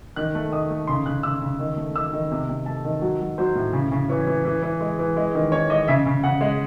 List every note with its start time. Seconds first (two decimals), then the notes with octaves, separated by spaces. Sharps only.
0.16 D#3 F#6
0.35 A3
0.52 D#3 D#6
0.70 A3
0.87 C#3 C6
1.06 C#3 F#6
1.23 C#3 E6
1.42 C#3
1.59 D#3
1.77 A3
1.95 D#3 E6
2.13 D#3
2.31 C3
2.49 C3
2.66 A3 A5
2.84 D#3
3.02 F#3
3.21 F#3
3.38 F#3 C5
3.55 A2
3.73 C#3
3.92 C#3
4.09 E3 C#5
4.27 E3
4.45 E3
4.63 E3
4.81 G#3
4.99 E3
5.16 G#3
5.35 D#3
5.52 D#3 C#5
5.70 G#3 D#5
5.88 C#3 E5
6.06 C#3
6.23 C#3 F#5
6.41 G#3